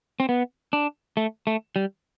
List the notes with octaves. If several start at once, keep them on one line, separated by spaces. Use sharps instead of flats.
C4
B3
D4
A3
A3
G3